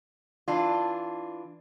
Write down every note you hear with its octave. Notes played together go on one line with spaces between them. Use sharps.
E3 D4 F4